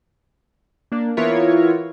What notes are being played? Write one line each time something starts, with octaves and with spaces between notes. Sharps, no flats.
A#3 D4
E3 B3 E4 F4 A#4 C#5